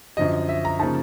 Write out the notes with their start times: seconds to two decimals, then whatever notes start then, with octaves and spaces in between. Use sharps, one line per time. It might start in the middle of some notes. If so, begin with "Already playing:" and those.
0.17 F#2 D3 F3 D#5
0.49 E5
0.65 A#5
0.79 C#3 F3 A#3 D#4 A5